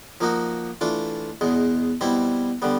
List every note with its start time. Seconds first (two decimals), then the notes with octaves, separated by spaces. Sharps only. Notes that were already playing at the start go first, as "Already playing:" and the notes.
0.21 F3 A#3 D#4 F#4
0.81 E3 A3 D4 F4
1.41 E2 B2 G#3
2.01 B2 G3 C4 E4
2.62 D3 G3 B3